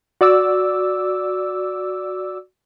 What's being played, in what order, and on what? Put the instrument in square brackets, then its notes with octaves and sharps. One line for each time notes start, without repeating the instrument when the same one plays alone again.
[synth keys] F#4 D5 D6 E6